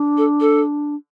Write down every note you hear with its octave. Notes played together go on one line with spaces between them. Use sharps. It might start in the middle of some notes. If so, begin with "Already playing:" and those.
Already playing: D4
A4
A4